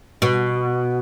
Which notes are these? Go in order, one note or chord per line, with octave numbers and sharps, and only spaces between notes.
B2